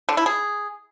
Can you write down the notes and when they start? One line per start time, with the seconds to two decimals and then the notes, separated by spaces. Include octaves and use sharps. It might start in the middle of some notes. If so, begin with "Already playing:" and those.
0.09 D3
0.17 E4
0.26 G#4